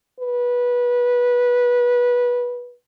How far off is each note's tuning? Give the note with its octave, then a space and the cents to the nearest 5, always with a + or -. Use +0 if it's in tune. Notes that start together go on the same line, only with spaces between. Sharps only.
B4 -20